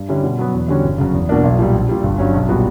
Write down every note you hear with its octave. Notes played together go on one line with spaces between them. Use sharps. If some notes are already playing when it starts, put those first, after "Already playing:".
Already playing: G2
D3 G3 C#4 E4
B2
F#3 B3
E2
D3 G3 C#4 F#4
G1
F#2 C#3
E2
B2 A#3 D4
B1
A#2 G3
A#1
A#2 G3
G1
G2 F#3 C#4
B1
A#2 G3 B3 F#4